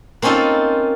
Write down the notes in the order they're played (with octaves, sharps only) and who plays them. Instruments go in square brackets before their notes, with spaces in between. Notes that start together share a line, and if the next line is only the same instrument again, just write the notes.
[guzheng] A#3 C4 C#4 D#4 F4 A4